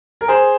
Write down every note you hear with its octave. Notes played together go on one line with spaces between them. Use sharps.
A#4
G#4 C5